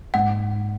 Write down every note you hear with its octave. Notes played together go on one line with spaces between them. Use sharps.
G#2 F#5